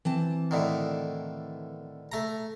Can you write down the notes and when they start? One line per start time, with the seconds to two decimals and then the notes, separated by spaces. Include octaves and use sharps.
0.05 E3 C4 A5
0.51 A2 D3 D#3
2.12 A3 A#5